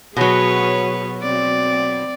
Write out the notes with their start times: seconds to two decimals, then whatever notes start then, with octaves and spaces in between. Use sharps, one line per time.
0.16 B2 F#3 G#4 B4 C#5
1.22 C4 D5